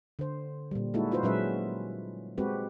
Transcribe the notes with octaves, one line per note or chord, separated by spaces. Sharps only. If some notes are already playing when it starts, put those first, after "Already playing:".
D3 C5
A#2 G3
G#3 A#3 D#4 E4 F#4 A4
D#4 F4 F#4 G#4 B4 C5
A#2 F#3 G#3 C#4 B4 E5
G#3 C4 F#4 G4 B4